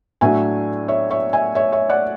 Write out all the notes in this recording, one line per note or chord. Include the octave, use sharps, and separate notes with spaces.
A2 F#3 A3 D4 E5 G#5
C#5 E5
C#5 E5
E5 G#5
C#5 E5
C#5 E5
D5 F#5